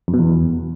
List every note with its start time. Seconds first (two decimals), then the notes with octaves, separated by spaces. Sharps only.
0.08 F2
0.14 B2
0.19 E2